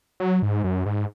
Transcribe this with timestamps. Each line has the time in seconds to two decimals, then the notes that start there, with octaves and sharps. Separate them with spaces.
0.20 F#3
0.42 G#2
0.64 F#2
0.86 G#2